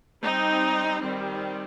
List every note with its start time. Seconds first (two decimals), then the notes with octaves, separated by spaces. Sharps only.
0.22 G3 C4 D#4
1.02 D#3 G3 C4